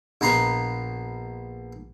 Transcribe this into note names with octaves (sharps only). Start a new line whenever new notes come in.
A#1 B3 A#5 C6